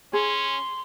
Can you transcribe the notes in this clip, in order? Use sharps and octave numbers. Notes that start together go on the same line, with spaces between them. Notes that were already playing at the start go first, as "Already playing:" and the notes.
C#4 G#4 C6